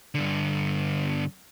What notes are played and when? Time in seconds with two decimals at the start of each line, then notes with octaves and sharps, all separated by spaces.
0.15 G2 D3